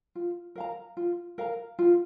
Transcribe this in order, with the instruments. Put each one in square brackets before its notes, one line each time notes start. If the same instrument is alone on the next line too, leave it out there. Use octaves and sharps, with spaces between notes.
[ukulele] F4
A#4 F5 A#5
F4
A#4 F5 A#5
F4